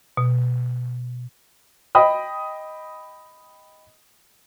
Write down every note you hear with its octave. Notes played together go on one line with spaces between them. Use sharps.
B2
D#5 G5 B5 D#6